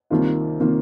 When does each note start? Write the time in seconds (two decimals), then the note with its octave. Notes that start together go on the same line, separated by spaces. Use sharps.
0.10 C2 C3 D#3 A#3 F4
0.60 C3 D#3 A#3 F4